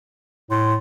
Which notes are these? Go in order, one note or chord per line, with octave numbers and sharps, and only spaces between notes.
A2 C6